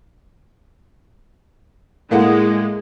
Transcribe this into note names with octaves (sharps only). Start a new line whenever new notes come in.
A2 G#3 A#3 F#5